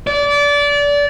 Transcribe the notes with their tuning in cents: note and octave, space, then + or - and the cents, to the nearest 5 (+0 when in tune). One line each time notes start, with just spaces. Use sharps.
D5 -25